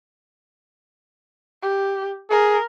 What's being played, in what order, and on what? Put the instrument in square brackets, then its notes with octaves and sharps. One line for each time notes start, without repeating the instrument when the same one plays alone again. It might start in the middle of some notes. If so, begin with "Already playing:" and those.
[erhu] G4
[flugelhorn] G#4 [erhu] A#4